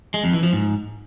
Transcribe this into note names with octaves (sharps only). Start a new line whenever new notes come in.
G#3
F2
E3
F3
G#2